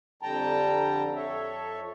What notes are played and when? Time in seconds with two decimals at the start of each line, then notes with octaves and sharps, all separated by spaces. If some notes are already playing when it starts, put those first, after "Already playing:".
0.22 F2 D3 G3 G5 A5 A#5
1.16 F2 A4 C#5 E5